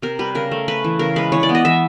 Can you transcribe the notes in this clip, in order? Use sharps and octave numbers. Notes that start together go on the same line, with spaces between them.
C3 A#4
G3 B4
C#3 A#4
A3
A3 B4
E3
C#3 A#4
G#3 B4
E3 C#5
D5
B3
D#5
E3 E5